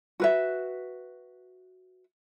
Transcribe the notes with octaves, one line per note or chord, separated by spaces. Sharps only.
F#4 B4 E5